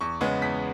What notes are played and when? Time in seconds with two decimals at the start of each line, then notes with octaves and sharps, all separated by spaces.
0.01 E2 C#6
0.21 C#3 G#3 B3
0.42 E2 B6